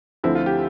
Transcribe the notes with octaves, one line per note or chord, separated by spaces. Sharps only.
D2 D3 F3 C4 E4
F4
G4